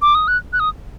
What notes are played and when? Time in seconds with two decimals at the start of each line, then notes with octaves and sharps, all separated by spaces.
0.02 D6
0.15 D#6
0.28 F#6
0.53 F#6
0.60 D#6